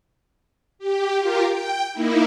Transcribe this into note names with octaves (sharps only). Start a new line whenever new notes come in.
G4
F4 G4 A#4
G5
A#3 D#4 E4